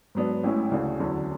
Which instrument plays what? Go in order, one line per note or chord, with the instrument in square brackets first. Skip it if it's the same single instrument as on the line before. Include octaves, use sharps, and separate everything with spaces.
[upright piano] G#2 F#3 B3 D4
A1 A2 G#3 C#4 E4
D2 C#3 E3 A3 D4
E2 D3 F#3 C#4 E4